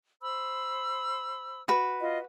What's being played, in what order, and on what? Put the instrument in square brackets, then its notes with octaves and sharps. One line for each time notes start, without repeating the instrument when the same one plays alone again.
[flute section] C5 B5 E6
[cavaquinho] F#4 B4
[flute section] F4 D#5